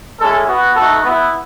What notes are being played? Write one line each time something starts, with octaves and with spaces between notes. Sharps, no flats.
G#3 C#4 E4 A4
B3 F#4
A3 D#4 F#4 A4
B3 E4